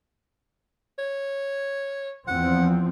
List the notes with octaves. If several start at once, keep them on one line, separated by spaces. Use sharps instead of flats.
C#5
E2 F3 C4 F#5